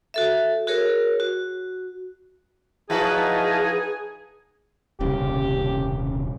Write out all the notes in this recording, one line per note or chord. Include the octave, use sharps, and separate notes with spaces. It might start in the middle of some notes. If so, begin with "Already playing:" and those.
F#4 A4 E5
F#4 G#4 A#4 C#5
F#4
F3 D#4 E4 F#4 G#4 B4 F5 A5
D#1 C2 C#3 G4